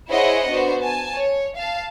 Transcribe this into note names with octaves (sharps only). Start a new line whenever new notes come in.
E4 G#4 C5 C#5 D#5 F#5
B3 D4 F#4 C5
G#5 A5
C#5
F5 A5